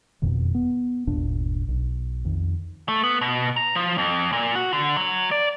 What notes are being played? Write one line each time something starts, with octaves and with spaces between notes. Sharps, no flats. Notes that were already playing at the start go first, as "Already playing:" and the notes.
F#1 F2 B2 D#3
B3
G1 D#2 A#2 D4
B1
F2 D#3
A3
B3
B2
A#5
F3
F2
A#2
F#4
D3
F#3
D5